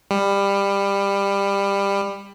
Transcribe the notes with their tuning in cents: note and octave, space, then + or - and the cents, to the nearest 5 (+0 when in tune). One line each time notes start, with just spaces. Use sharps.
G3 +20